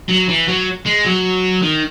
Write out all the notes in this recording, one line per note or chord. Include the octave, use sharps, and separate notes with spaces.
F#3
E3
F#3
G#3
F#3
D#3